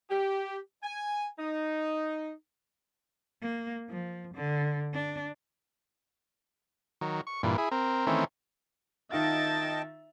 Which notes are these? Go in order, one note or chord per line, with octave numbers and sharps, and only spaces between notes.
G4
G#5
D#4
A#3
F3
D3
D4
D#3 F#3
C#6
G2 A#2 E3
E4 G#4
C4 A#4
D#3 E3 A3 C4 C#4
D#3 D#4 F4 D#5 E5 G5 A5 A6